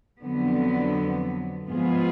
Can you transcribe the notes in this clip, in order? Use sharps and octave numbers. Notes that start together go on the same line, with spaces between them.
F2 D3 F#3 B3
G#2 F3 B3 F4 G#4